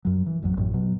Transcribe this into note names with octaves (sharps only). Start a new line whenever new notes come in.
F#2 F#3
E3
A1 F2 F#3
A1 F#2 A2
B2 F#3